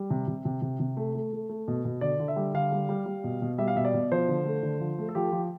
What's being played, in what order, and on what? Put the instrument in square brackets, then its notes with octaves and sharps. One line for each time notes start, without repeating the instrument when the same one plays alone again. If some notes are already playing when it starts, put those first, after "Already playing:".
Already playing: [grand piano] G3
C3
C3
C3
C3
C3
A3
A3
A3
A3
B2
B2
D3 D5
D3
E5
G3
D3 F5
G3
G3
G3
B2
B2
G3 E5
F5
B2 E5
D5
B2
F3 C5
D3
A3
D3
F3
A3
A4
F3 G4
F3